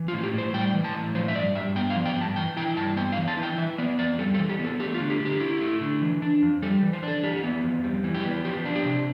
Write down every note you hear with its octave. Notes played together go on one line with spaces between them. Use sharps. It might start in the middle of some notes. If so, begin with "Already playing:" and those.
Already playing: E3
F4
A2
G4
A2 C5
G3 G5
E3
A5
A2
F3 C5
E5
G2 D5
G2 E5
B3 G5
F5
F3
G5
G2
A5
E3 G5
E4 G5
G2 A5
B3 G5
F5
E3
A5
E4
G5
E3 E5
B3 D5
F2 D5
G3 A4
A4
E3
G4
B3
A4
A3 G4
F4
D3
G4
D3
G4
E4
A3
D3
E3
D4
F2
G3 A4
E3
C5
D4 A4
E3 G4
B3
F2
G3
E3
G4
B3
F3 G4
D4
G4
C3